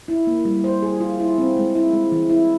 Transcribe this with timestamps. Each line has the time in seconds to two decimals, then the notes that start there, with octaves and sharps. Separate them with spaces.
0.08 E4
0.27 A#3
0.45 G3
0.64 C5
0.82 G#4
1.00 F4
1.20 E4
1.38 C4
1.57 G#3
1.75 E4
1.93 G#3
2.12 E3
2.30 E4